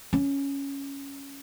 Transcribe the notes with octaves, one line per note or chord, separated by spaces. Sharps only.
C#4